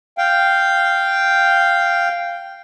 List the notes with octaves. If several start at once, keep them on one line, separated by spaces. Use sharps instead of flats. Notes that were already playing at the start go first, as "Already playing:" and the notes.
F5 G5